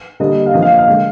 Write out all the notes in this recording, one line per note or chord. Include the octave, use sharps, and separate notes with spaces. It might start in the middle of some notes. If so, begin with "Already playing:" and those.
D3 G3 A#3 D#5
F5
D3 F3 A#3 D#5
F5
D#5
F5
D3 G#3